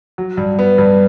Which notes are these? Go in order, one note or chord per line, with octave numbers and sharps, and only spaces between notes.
F#3
G2
B3
G2